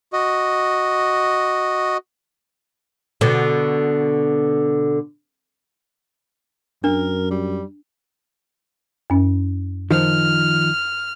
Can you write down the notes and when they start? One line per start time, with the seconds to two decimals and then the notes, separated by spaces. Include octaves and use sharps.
0.13 F#4 D#5
3.21 B2 D3
6.84 F#2 D4 A#4
7.31 G3
9.10 F#2 C#4
9.91 D#3 F3 F6